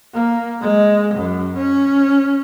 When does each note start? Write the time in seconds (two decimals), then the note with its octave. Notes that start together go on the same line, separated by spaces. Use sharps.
0.14 A#3
0.62 G#3
1.15 F#2
1.57 C#4